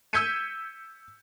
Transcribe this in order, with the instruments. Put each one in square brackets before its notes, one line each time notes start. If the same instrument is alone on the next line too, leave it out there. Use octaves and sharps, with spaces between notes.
[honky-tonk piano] E6 G6 G#6 B6 C#7 D#7